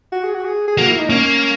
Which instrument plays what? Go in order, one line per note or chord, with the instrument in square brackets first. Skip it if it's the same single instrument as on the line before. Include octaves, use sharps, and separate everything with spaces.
[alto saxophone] F#4
G#4
F#4
G#4
G#4
[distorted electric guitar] A#3 [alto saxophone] F#4
[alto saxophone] E4
D#4
[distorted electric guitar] A#3 [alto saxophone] C#4